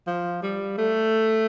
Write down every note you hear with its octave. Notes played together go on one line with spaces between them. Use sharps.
F3
G3
A3